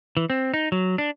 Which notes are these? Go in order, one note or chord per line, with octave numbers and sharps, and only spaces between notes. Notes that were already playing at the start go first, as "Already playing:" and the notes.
E3
C4
D#4
F#3
D4